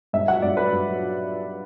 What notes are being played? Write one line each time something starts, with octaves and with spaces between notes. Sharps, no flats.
G2 E5
F#3 F#5
G2 D5
F#3 B4
G2
F#3